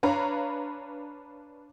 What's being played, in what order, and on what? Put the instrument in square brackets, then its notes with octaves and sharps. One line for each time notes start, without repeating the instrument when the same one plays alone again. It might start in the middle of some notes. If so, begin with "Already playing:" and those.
[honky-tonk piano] D4 B4 C#5 F5 A#5 B5